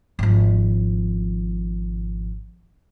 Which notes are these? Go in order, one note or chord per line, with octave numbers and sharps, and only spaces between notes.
G#1 F3